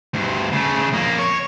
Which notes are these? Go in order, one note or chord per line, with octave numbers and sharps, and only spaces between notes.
D2 G2
C#3 A3
F2 A#3
C#5